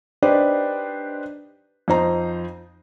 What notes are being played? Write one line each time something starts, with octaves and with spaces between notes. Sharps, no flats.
D4 D#4 G4 B4 C5 D5
F2 D#4 C5 A#5